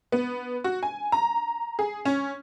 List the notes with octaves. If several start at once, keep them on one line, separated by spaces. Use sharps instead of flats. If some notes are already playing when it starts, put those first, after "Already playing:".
B3
F#4
G#5
A#5
G#4
C#4